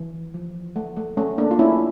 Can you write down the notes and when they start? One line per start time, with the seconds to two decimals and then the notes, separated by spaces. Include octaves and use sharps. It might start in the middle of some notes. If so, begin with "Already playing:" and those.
Already playing: E3
0.34 F3
0.76 A3
0.96 A3
1.17 A3 C#4
1.38 A#3 D4
1.51 F4
1.59 C#4 E4